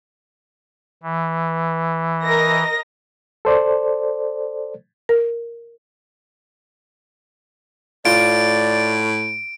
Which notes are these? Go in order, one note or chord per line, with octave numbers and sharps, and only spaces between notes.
E3
A#4 D#5 A#6
A4 C5 D5
A#4
A2 F4 D5 D7